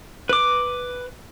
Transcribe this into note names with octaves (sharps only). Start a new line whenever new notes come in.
B4 D6